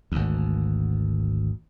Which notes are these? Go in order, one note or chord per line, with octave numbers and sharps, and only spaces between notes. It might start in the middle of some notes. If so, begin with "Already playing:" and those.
G#1 D2